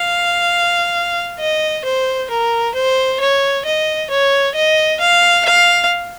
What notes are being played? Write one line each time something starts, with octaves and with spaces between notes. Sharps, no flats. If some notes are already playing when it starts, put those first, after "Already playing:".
Already playing: F5
D#5
C5
A#4
C5
C#5
D#5
C#5
D#5
F5
F5